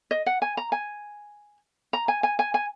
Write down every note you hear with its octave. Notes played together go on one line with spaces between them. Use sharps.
D#5
F#5
G#5
A#5
G#5
A#5
G#5
G#5
G#5
G#5